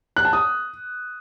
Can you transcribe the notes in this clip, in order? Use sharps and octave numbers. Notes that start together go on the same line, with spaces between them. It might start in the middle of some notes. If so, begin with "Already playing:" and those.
F#6
A5
D#6